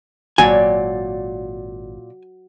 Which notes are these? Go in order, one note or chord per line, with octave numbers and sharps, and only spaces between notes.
G#1 A#2 F#3 D5 G5 G#5